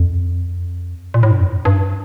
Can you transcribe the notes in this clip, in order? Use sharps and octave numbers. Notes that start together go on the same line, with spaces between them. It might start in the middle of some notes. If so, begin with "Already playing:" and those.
Already playing: F2
A#2
A2
G2
F2
G2